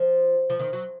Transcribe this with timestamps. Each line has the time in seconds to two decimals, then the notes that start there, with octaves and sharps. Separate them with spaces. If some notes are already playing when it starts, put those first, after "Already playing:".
Already playing: F3
0.50 F3
0.59 D#3
0.73 F#3